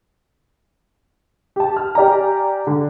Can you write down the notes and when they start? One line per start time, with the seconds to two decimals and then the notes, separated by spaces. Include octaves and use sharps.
1.56 G4 A5
1.77 F6
1.95 G4 D5 G#5 A#5
2.67 D3